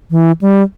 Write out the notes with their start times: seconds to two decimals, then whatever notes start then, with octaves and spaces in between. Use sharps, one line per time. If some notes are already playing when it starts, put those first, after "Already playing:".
0.11 E3
0.41 G3